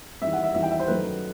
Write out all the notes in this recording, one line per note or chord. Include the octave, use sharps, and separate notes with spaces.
E2 D#3 G3 E5
F#5
E5
E2 D#3 G3 E5
G5
E5
C5
F#2 D#3 F#3 A3 B4